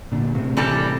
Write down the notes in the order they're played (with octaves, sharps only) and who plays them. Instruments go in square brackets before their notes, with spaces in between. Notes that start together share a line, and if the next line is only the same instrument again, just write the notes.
[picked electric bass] A#2 D3
A2 C3
[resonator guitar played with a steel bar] E3 G3 D4 A4